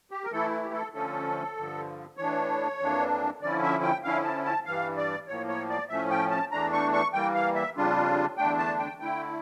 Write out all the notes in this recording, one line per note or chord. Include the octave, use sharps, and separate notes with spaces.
G4
A#4
E3 A3 E4 A4
G4
A4
D3 F3 A3 C#4 A4
G2 D3 F3
A2 E3 A3 D4 C#5
F2 E3 A#3 D4
D3 F3 C#4 E4 D5
E5
G5
D3 F3 C#4 E4 F5
A5
A5
G2 E3 G3 F5
D5
A2 F3 A#3 C#5
C#5
D5
A2 F3 A3 C#4 E5
G5
A5
E2 E3 A3 D4 A#5
C#6
C#6
E3 G3 A#3 G5
F5
E5
F2 C#3 G3 D4 F4
E2 D3 A3 D4 G5
A5
G5
D3 A3 E4 G5